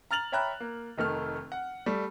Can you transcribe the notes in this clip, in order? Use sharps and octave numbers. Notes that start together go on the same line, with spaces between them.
A#5 F6 A6 F7 F#7
C#5 E5 G5 A#5 B5 F#6
A#3
F1 D#3 A3 F6
F#5
G3 A3